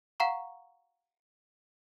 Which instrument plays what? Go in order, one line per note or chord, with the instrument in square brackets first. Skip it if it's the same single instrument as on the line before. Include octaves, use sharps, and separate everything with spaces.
[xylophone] F5 F#5 A#5 C#6